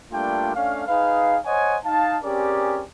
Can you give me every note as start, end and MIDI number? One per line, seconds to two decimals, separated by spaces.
0.12 0.51 55
0.12 0.51 57
0.12 0.51 58
0.12 0.51 62
0.12 0.51 65
0.12 0.51 79
0.55 0.84 57
0.55 0.84 61
0.55 0.84 62
0.55 0.84 77
0.87 1.38 63
0.87 1.38 68
0.87 1.38 71
0.87 1.38 77
1.46 1.77 72
1.46 1.77 73
1.46 1.77 75
1.46 1.77 78
1.46 1.77 80
1.85 2.17 63
1.85 2.17 77
1.85 2.17 81
2.24 2.84 60
2.24 2.84 61
2.24 2.84 67
2.24 2.84 68
2.24 2.84 70
2.24 2.84 74